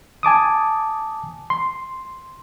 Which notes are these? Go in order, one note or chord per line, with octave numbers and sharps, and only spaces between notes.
G#5 A5 D6 D#6
C6